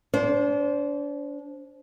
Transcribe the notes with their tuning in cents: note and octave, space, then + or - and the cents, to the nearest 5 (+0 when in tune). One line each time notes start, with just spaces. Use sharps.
D4 -30 C5 +0